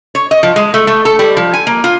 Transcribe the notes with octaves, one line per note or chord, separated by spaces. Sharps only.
C#5
D#5
F3
G#3
A3
A3
A4
G3
F3
G#5
A#3
F4